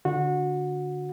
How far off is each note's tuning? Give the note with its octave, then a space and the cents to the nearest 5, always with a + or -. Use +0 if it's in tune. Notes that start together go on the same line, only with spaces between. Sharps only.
D3 -10 F#4 -20